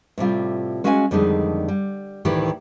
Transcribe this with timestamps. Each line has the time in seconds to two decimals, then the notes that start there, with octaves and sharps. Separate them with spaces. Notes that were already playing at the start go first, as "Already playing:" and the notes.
0.18 A2 C3 G3 F4
0.84 G#3 C#4 F#4 F5 G5 G#5
1.11 F2 D3 D#3 G3 G#3 D#4
1.68 G3
2.25 D2 A2 D#3 E3 G4